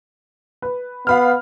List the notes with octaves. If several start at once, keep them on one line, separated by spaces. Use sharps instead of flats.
B4
B3 F5 B5 F6